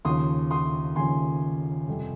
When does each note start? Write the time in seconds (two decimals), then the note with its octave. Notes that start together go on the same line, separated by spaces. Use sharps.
0.05 D#2 C#3 F3 C6 D#6
0.51 C6 D#6
0.96 D#2 C#3 F3 G#5 C6
1.87 F2 C3 G3